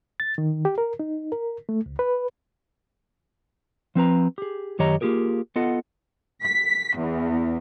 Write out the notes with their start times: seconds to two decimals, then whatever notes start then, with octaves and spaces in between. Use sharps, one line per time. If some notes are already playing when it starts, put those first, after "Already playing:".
0.20 A6
0.38 D#3
0.65 G4
0.78 A#4
1.00 D#4
1.32 A#4
1.69 A3
1.86 C#2
1.99 B4
3.95 F3 C4 B4 A#5
4.38 G4 G#4
4.79 F#2 D#3 G4 C#5 D#5 A#5
5.01 A#3 F4 G4 G#4 A#4
5.56 B3 F4 A4 D#5 F#5
6.44 B6
6.98 E2